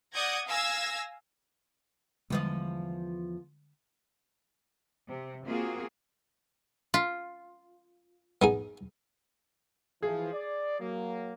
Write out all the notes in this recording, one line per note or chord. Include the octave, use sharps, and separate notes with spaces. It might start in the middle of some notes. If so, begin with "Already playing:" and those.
D5 F#5 D#6 G6 G#6 A#6
F5 G#5 E6 G#6 A#6
E2 D3 F3 G3 G#3 D#5
C3
A#3 C4 F4 F#4 G#4
F4
B3 D#4 G#4
E3 F3 G#4
D5
F#3 A#3